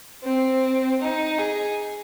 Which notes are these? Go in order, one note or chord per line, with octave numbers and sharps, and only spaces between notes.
C4
D#4
G#4